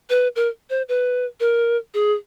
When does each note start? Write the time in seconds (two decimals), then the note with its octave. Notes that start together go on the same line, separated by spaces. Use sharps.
0.09 B4
0.36 A#4
0.70 C5
0.89 B4
1.40 A#4
1.94 G#4